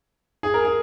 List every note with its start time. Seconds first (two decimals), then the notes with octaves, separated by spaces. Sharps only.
0.43 G#4
0.54 A#4
0.64 G#4